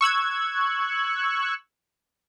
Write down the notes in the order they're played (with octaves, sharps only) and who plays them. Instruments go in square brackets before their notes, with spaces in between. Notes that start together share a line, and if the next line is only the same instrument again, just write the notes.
[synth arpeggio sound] C#6 E6 F#6 G#6